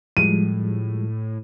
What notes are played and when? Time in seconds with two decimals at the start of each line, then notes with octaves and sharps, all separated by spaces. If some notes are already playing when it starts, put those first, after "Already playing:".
0.17 A2 F3 G3 G#3 D#7